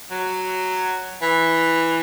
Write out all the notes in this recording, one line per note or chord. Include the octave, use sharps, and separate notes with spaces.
F#3
E3